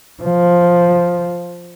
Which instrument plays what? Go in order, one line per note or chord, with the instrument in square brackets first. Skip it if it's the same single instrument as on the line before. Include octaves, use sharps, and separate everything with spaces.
[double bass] F3